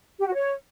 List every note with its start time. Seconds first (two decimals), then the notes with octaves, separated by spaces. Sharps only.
0.19 G4
0.26 F#4
0.34 C#5